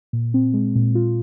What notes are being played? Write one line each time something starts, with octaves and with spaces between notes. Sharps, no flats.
A#2
C4
G#3
A#2
F4